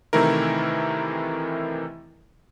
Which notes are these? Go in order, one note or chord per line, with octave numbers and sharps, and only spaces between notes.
C3 D#3 E3 A3 E4 A#4